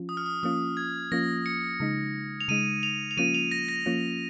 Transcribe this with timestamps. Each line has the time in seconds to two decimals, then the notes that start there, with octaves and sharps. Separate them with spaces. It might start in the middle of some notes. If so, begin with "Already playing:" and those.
Already playing: F3 C#4 F4
0.09 D#6
0.17 F6
0.26 D#6
0.43 F3 A#3 C#4 F4 D#6
0.77 G#6
1.12 F3 A#3 C#4 F4 A#6
1.46 C#7
1.80 C#3 G#3 D#4
2.40 F7
2.48 C#3 G#3 D#4 D#7
2.83 F7
3.11 F7
3.17 F3 A#3 C#4 F4 D#7
3.34 F7
3.51 A#6
3.69 A#6
3.86 F3 A#3 C#4 F4